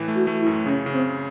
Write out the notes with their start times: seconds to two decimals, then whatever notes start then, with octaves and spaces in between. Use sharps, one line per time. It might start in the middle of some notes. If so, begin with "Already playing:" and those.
Already playing: A2 E3
0.08 A3
0.15 F#4
0.27 A3
0.40 E4
0.46 F#2
0.66 C#3 C#4
0.86 C#3
0.92 C4